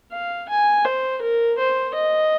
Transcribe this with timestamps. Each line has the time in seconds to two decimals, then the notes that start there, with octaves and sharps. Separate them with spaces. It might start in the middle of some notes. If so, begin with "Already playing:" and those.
0.12 F5
0.49 G#5
0.85 C5
1.22 A#4
1.58 C5
1.95 D#5